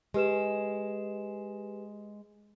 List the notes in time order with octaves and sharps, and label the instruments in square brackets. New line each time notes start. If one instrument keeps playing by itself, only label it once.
[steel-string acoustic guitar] G#3 [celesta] G4 B4 E7